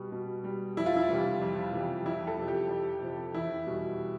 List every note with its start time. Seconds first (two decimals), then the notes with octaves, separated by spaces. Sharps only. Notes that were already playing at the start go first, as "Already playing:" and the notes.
Already playing: B2 G3
0.12 B2
0.44 G3
0.77 F2 E4
0.86 F4
0.97 E4
1.09 C3 E3 G3
1.41 F2
1.73 C3 E3 G3
2.05 F2 E4
2.27 A4
2.38 C3 F3
2.48 G4
2.69 F2
3.03 C3 F3
3.34 E2 E4
3.67 B2 G3